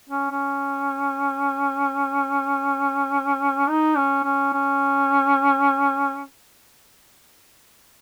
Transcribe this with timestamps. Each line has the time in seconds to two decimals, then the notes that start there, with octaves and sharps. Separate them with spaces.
0.09 C#4
0.31 C#4
3.69 D#4
3.97 C#4
4.24 C#4
4.53 C#4